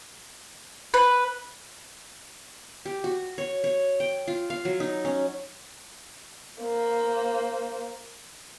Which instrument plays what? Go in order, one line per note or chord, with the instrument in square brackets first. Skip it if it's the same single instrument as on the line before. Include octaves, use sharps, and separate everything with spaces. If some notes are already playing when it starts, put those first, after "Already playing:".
[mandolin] B4
[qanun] G4
F#4
C#5
C#5
G5
F4
F5
F#3
D#4
C#4
[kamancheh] A#3 C5